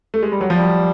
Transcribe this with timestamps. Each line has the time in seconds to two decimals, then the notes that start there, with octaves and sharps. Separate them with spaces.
0.14 A3
0.23 G#3
0.32 G3
0.41 F#3
0.50 F3 G3